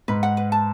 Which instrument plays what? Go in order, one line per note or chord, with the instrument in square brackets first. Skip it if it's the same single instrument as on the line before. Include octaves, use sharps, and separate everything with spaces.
[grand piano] G#2 [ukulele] B4
[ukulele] F#5
B4
A5